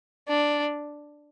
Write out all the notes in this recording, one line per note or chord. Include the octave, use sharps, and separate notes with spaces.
D4